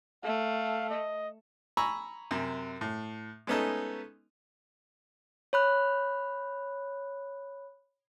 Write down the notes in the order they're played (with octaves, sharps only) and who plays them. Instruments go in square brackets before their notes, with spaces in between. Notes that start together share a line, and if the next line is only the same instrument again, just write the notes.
[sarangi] A3 [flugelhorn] F5
[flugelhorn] D#5
[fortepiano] G#5 A#5 B5 C#6 E6
F#2 C3
A2
G#3 A3 B3 C#4 D#4 A4
[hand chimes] C#5 B5 F#6